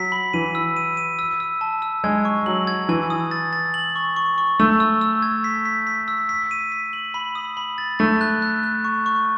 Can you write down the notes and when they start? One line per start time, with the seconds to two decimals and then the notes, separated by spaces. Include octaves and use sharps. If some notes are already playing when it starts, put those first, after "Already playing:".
Already playing: F#3 B6
0.12 B5
0.33 E3 D#7
0.55 E6
0.77 D#7
0.97 D#7
1.19 E6
1.40 E6
1.61 A5
1.82 E6
2.04 G#3 G#6
2.25 C#6
2.46 F#3 F#7
2.67 G#6
2.89 E3 G#5
3.10 D#6
3.31 A6
3.53 A6
3.74 F#7
3.96 C#6
4.16 C#6
4.38 C#6
4.60 A3 E6
4.80 E6
5.01 E6
5.22 G#6
5.44 B6
5.65 B6
5.87 B6
6.08 E6
6.29 B6
6.51 D#7
6.72 B6
6.93 F#7
7.14 B5
7.35 D#6
7.57 B5
7.78 A6
7.99 A3 A6
8.21 F#6
8.42 F#6
8.63 F#6
8.85 C#6
9.06 C#6